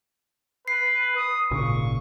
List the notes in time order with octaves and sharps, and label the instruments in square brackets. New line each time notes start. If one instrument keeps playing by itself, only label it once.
[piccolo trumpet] B4 [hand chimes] C7
[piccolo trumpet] D#6
[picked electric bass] G#1 A#2 C#3 [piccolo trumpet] C#6